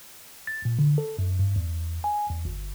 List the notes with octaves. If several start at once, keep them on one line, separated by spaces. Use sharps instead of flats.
A6
A#2
D3
A4
F#2
G2
E2
G#5
E2
G1